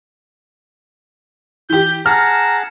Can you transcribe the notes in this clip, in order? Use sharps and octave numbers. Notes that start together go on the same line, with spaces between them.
E3 G4 G6
G#4 F#5 A5 A#5 F6